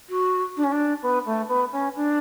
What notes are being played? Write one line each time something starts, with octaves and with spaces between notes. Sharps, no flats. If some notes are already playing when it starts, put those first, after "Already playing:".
F#4
D4
C#4
D4
B3
A3
B3
C#4
D4